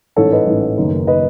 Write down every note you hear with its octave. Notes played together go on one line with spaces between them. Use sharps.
A1 G#2 E3 A4 C#5
B4 D#5
A1 G#2 E3
F#1 F#2 D#3
D#3 B4 D#5